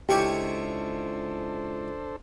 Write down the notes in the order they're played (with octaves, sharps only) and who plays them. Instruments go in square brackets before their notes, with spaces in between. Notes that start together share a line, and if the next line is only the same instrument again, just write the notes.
[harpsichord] C#2 E4 C#6 [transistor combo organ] D4 A4 C5 [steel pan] G4